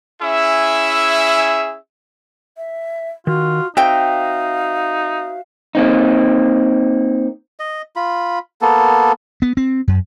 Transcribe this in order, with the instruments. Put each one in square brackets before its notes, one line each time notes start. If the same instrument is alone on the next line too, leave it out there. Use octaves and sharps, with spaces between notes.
[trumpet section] C#4 E4 G#4 E5
[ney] E5
[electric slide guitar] D#3 [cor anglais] F4 [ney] F#4
[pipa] C4 G5 [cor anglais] D#4 [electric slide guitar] F#4 C5 E5 [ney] F5
[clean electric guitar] A#3 C4 D#4
[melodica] D#5
F4 B5
A#3 B3 A4
[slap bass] B3
C4
F#2